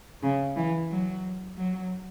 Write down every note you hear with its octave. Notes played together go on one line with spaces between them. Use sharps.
C#3
E3
F#3
F#3